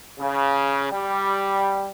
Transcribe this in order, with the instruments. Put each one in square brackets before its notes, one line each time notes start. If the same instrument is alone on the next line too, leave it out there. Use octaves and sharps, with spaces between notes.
[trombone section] C#3
G3